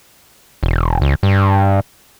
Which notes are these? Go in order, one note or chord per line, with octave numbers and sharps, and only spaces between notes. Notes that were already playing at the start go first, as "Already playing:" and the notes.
E1
C#2
G2